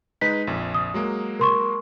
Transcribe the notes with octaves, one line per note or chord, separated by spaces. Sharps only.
G#3 D#4 B4 B6
A#1 F2
D#6
F#3 G#3 A#3
A#4 C6 C#6